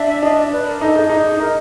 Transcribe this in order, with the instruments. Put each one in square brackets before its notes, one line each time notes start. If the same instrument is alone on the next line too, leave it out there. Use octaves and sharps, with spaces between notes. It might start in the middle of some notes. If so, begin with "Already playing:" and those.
Already playing: [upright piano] D4 [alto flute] E5
[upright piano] D4 [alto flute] D#5
[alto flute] D5
B4
A#4
[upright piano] D#4 [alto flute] A4
[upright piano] D#4 [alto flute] G#4
[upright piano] D#4
[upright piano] D#4 [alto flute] A#4